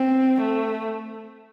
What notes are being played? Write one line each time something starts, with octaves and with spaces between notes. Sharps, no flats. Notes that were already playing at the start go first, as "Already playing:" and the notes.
Already playing: C4
A3